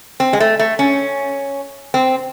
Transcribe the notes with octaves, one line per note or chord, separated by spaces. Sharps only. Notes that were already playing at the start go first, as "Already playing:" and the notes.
C4
G#3
A3
A3
C#4
C4